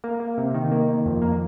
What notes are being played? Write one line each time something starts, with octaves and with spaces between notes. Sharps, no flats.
A#3
A#3
C3
D#3
A#3
D#3
F2
A#3